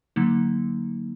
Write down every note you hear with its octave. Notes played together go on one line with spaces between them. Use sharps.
D3 F#3 A#3 D#4